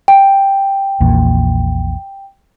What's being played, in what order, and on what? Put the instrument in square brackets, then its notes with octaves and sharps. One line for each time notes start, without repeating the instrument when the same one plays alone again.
[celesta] G5
[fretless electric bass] A#1 E2 A#2